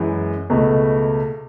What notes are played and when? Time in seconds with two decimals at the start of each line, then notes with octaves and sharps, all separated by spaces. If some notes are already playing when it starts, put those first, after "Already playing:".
Already playing: F#2 E3 G#3
0.50 C#2 B2 A3